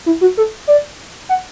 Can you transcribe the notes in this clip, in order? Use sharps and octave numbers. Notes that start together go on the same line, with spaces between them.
E4
F#4
A4
D5
F#5